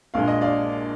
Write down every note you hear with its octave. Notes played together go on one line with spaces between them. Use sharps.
A#1 A#2 G#3 D4 F5
D#5
D5 F5